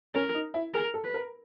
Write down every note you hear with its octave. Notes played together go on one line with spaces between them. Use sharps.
C#4 A#4
D#4
E4
G#4 A#4
A4
B4
A#4